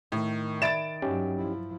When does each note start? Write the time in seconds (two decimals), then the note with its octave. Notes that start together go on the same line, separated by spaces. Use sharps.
0.12 A2 D#3
0.62 D5 E5 B5 A6 D7 E7
1.02 G2 F#3 C#4 D#4 G4
1.38 F3 E4